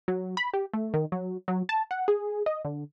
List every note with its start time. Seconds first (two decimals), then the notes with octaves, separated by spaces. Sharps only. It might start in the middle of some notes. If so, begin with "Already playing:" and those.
0.08 F#3
0.37 B5
0.53 G4
0.73 A3
0.94 D#3
1.12 F#3
1.48 F#3
1.69 A5
1.91 F#5
2.08 G#4
2.46 D#5
2.65 D3